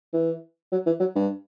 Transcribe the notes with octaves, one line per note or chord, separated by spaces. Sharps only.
E3
F#3
E3
F#3
G2